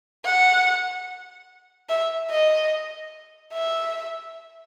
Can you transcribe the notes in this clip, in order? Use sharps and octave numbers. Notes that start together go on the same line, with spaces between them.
F#5
E5
D#5
E5